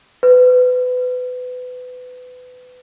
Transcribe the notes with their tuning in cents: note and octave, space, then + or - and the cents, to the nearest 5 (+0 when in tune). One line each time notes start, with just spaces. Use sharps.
B4 +25